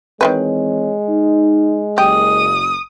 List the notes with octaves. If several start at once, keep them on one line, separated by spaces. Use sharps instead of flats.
D#3 E3 G3 G#3 C4 B4 C#5
D#4
F#1 G4 D#6